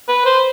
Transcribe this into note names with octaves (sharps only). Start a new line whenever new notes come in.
B4
C5